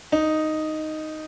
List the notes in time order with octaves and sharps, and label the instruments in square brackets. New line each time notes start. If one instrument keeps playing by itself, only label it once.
[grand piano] D#4